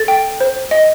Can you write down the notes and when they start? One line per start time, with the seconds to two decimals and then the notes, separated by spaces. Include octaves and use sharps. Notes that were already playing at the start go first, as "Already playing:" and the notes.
Already playing: A4 A6
0.08 G5
0.40 C5
0.71 D#5